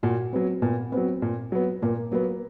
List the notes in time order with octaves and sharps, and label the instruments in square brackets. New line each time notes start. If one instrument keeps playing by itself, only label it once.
[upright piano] A#2 [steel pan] F#4
[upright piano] F#3 B3 [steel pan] C4
[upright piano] A#2 [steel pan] B3
[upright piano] F#3 B3 [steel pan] C4
[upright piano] A#2
F#3 B3
[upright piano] A#2 [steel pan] A#3
[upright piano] F#3 B3 [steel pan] A#3